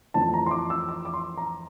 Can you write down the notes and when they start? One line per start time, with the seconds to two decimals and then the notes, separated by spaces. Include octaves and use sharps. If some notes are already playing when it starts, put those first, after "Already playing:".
0.14 F2 E3 A3 C4 A5
0.34 A#5
0.46 C6
0.51 D6
0.70 E6
0.89 D6
1.05 D6
1.14 C6
1.37 A#5